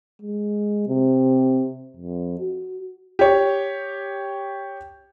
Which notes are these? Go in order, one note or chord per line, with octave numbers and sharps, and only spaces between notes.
G#3
C3
F2
F#4
G4 C#5